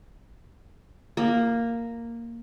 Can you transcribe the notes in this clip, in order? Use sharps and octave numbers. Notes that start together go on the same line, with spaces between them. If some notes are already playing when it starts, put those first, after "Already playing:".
A#3